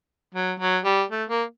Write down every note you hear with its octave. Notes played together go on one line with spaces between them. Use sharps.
F#3
F#3
G3
A3
A#3